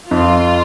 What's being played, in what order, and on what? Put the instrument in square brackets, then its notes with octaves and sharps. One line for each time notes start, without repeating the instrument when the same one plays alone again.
[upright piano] F2 [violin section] F4